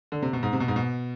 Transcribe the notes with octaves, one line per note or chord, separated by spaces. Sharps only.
D3
C3
B2
G#2
C3
B2
G#2
B2